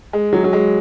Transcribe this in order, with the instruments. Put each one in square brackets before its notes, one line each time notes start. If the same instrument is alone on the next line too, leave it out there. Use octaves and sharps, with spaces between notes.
[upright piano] G#3
F#3
F#3
G#3